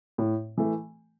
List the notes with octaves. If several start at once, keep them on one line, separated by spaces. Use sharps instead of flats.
A2
E3 A3